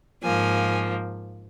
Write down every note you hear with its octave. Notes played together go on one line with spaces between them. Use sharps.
G#2 F3 A#3 G#5